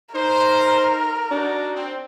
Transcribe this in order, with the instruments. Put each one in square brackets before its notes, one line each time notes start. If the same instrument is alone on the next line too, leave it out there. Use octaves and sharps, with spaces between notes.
[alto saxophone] D#4 [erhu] A#4 [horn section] C5
[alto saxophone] D4 [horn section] D#4 F#4
[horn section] C4